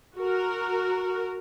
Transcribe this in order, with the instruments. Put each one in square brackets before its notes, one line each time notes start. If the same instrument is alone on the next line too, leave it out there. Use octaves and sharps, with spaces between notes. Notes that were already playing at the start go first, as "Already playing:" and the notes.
[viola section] F#4 A#4